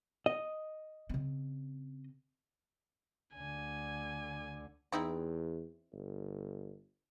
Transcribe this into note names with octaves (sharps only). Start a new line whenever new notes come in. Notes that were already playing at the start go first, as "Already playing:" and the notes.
D#5
C#3 C4
D2 D3 G#5
E2 C4 D#4 E4
G1